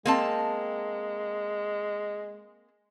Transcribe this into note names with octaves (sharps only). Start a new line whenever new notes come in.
G#3 A#3 C4 A5